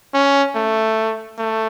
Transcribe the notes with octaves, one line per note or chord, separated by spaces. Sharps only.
C#4
A3
A3